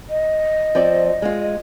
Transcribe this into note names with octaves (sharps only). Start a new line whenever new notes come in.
D#5
F3 C4 D5
G#3 F4